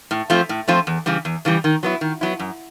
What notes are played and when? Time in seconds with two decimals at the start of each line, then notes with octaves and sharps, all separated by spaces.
0.11 A2
0.30 F3 A3 C4 F4
0.49 A2
0.68 F3 A3 C4 F4
0.87 E2
1.06 C#3 E3 G3
1.25 E2
1.45 C#3 E3 G3
1.64 D#3
1.83 F#3 B3 E4
2.01 D#3
2.21 F#3 B3 E4
2.39 F#2